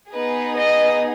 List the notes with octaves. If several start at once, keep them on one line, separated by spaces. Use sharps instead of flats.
B3 D#4 G#4 B4
D#5